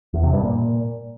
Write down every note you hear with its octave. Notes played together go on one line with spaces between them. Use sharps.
E2
C3
G2
A#2